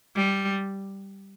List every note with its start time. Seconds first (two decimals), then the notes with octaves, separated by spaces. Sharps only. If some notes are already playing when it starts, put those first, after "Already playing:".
0.16 G3